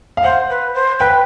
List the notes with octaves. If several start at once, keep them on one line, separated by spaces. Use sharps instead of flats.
F5
C5 F#5
B4
C5
B4 G5